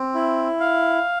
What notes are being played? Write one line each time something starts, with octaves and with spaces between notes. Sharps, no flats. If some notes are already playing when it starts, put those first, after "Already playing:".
Already playing: C4
E4
F5